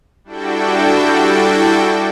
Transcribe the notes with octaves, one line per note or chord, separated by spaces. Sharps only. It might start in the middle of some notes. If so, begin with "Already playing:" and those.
G3 D4 E4 F#4 A4 G5